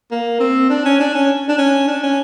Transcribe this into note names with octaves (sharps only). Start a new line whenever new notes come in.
A#3
C4
D4
C#4
D4
C#4
D4
C#4
D4
C#4